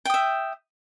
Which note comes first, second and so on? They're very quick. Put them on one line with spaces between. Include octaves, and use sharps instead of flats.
G5 D#6 E5